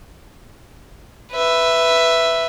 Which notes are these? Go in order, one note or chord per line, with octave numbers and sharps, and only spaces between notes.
B4 E5